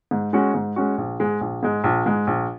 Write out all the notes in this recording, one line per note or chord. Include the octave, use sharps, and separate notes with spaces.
G#2
G#3 C#4 F#4
G#2
G#3 C#4 F#4
A#1
G#2 G#3
A#1
G#2 G#3
A#1
G#2 G#3
A#1